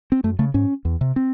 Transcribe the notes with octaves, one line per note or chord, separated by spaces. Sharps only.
C4
F#2 A3
C#3 A3
G#2 C#4
E2
C3
C4